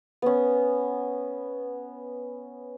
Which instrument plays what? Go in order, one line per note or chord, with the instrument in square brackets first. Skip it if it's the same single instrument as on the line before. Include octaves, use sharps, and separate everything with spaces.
[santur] B3 C#4